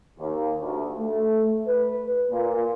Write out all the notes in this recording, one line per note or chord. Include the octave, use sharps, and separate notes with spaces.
D#2
D2
A3
B4
A#2